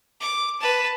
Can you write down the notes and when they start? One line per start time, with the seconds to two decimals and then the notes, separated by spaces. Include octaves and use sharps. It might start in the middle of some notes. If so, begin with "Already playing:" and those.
0.20 D6
0.60 B4 A5